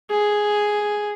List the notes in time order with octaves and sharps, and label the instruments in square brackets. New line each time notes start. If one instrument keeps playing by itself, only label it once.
[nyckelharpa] G#4